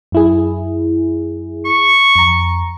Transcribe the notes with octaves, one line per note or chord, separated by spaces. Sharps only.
F#2 E4 G#4
C#6
F2 A#5